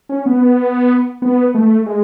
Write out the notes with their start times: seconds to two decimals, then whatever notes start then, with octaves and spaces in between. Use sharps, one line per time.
0.09 C#4
0.26 B3
1.22 B3
1.54 A3
1.86 G#3